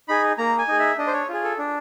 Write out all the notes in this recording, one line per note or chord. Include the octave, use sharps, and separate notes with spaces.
D#4 G#4 B5
A#3 A#5
G#5
D#4 G#4
E5
D4 D#5
C5
C#5
F4 G#4
A4
D4